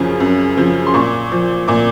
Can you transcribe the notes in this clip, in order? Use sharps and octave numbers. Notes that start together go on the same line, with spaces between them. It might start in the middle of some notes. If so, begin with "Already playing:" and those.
Already playing: F#2 C#3 F3
F#2
C#3 F3
C6
A#2 C#6
F3
A#2 D6